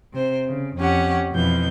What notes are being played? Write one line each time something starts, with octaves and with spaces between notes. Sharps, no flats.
C3 C5
C#3
F2 C#4 G4 F#5
F2 B2 E3 G6